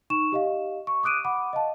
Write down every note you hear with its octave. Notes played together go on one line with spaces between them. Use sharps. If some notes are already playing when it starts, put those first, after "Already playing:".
D#4 C#6 E7
G4 D#5 F5
C#6
D6 D#6 F#6 D7 D#7
F#5 B5 D6
D#5 F5 A5